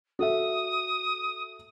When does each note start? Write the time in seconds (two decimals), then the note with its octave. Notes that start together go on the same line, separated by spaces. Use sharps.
0.19 F#4 A4 E5 D#6